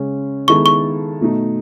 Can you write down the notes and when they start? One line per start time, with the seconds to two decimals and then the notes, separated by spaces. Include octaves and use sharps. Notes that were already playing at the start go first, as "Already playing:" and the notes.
Already playing: C#3 G#3 C#4
0.48 D#3 G#3 B3 E4 A4 C#6
0.66 C#6
1.21 B2 A3 D#4